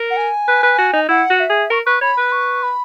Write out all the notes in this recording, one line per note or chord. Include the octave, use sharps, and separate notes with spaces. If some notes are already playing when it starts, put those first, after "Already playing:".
Already playing: A#4
F#5
G#5
B4
B4
F#4
D#4
E4 F#5
F#4
E5
G#4
A#4 C#6
B4 C#6
C#5 B5
B4
C#6
B5